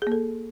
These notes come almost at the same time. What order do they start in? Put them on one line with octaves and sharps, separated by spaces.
G#4 A#3 A4